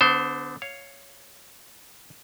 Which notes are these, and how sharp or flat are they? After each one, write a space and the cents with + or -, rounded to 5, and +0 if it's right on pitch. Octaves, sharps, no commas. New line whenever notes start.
D3 +0 B3 +35 C5 +0
C#5 +0 F5 +0